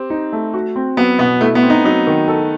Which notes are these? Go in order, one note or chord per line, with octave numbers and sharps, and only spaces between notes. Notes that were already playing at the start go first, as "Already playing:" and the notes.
Already playing: C4 G4
D#4
A3
F#4
C4
F#3 B3
B2 B3
A3 E4
B3
C4
D#4
F#3 D#4
D#3
A4